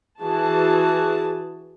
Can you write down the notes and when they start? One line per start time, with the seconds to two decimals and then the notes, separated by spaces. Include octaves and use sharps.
0.22 E3 F#4 G#4 A5